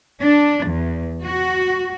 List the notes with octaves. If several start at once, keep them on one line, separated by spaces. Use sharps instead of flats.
D4
E2
F#4